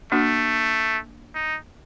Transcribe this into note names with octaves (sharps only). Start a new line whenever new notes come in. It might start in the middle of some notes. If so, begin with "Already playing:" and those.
A3 A#3 D4 F#4
D#4